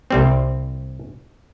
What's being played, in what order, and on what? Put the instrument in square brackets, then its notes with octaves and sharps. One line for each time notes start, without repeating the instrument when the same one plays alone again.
[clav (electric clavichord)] C2 G3 C4